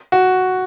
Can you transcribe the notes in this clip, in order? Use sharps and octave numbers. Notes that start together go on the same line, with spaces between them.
F#4